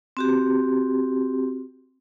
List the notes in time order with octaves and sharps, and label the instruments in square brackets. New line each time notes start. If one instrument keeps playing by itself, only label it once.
[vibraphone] C4 F#4 G4